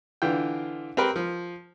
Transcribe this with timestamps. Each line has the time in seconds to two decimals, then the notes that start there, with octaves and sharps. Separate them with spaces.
0.22 D3 E3 F4 G5
0.97 C4 G4 A#4 B4
1.16 F3